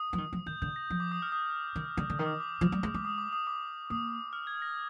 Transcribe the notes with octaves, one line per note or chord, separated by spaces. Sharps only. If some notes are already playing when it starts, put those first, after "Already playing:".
Already playing: D#6
F3
D#3
F3
D#3 G6
D3 G6
A#6
F3
D6
D#6
F6
D#6
D#3
D3
D3
D#3 D#6
D6
D6
F3
G3
G#3
G#3 D6
D#6
D6
D#6
D6
A#3 D#6
F6
G#6
A#6